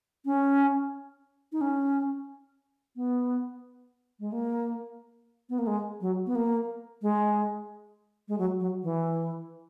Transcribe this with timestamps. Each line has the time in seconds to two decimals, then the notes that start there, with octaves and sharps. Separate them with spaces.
0.25 C#4
1.52 D#4
1.61 C#4
2.96 B3
4.20 G#3
4.32 A#3
5.50 B3
5.59 A#3
5.67 G#3
6.01 F#3
6.26 B3
6.35 A#3
7.02 G#3
8.28 G#3
8.38 F#3
8.60 F#3
8.83 E3